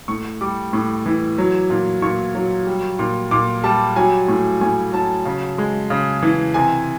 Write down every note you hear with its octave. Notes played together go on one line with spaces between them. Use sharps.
A2 C#6
G3 D6
A2
E3
F#3
A#2
A#2 C#6
F#3
G3
A#2
A#2 D6
G3 A5
F#3 G#5
A2
A2 G#5
F#3 A5
C#3
G#3
C#3
E3
C3 G#5